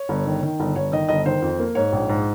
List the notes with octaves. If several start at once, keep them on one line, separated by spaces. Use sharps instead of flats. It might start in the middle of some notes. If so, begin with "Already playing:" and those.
Already playing: C#5
G1
D#3
D#3
G1
G1 C#5
D#3 D#5
G1 D#5
D#3 C5
F2
A#3
G#2 C#5
A#1
G#2